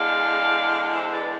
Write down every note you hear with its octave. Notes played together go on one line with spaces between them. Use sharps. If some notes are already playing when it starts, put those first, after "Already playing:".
Already playing: E2 D3 G#3 D5 F5
C5 E5
B4 D5
B4